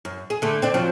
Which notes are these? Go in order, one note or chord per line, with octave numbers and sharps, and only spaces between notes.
F#2
G#4
D3 A3
C4 D4
F3 F#3 C4